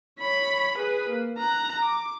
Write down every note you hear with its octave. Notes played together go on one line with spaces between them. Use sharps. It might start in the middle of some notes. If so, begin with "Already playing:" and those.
C#5 B5
G#4 B4
A#3
A#5 F#6
D6